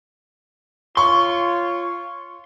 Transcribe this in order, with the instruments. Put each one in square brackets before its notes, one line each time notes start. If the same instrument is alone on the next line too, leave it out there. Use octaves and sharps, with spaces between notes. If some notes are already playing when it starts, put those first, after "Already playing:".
[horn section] F4 C#5 [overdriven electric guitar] C6 [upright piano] C#6